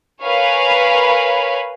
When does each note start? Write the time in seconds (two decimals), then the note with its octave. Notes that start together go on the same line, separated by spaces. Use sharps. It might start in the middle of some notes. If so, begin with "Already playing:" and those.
0.23 A#4 B4 C#5 F5 G#5 B5